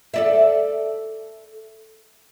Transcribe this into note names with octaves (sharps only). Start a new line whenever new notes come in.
A4 D5 E5